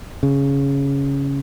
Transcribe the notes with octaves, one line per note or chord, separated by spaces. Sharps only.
C#3